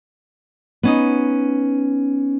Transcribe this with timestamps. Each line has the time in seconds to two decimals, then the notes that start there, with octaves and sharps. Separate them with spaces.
0.83 B3 C#4 D#4